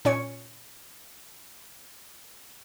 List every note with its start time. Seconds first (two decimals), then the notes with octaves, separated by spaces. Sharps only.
0.05 A#2 C#4 C#5 C#6 C#7